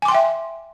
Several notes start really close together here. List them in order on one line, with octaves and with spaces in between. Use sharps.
G#5 D6 C6 G5 E5